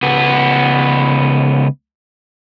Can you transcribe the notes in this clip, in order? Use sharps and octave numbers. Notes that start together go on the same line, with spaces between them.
C#2 B3